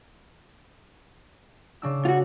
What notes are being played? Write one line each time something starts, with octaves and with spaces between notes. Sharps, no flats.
C#3 D4 E6
F4 F#4